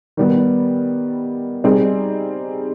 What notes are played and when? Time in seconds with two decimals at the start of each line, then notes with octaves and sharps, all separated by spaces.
0.17 D#3 G3 B3
1.64 G3 C4 D#4 G#4